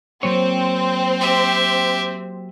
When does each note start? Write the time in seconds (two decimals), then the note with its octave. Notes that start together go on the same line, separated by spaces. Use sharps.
0.23 F#3 A#3 C4 C#5
1.20 G4 E5